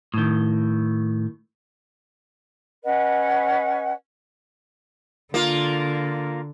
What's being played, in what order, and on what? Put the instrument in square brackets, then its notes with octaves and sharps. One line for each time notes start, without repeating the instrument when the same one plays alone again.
[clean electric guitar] A2 D#3
[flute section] C#4 B4 D#5 F#5
[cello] D3 [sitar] A#3 F4